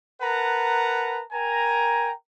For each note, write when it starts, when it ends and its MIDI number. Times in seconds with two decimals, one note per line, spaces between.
0.21 1.21 70
0.21 1.21 71
0.21 1.21 78
0.21 1.21 81
0.21 1.21 82
1.32 2.11 70
1.32 2.11 79
1.32 2.11 80
1.32 2.11 82